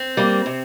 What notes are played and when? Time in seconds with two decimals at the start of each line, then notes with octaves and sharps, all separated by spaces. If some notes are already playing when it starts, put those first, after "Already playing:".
Already playing: C4
0.17 G3 A#3
0.46 C3